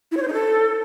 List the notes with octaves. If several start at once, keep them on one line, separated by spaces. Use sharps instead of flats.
E4
C#5
C5
D#4
A4